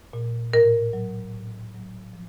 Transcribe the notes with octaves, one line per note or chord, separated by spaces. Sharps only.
A#2
A2 A#4
F#3
A2
F#3
F3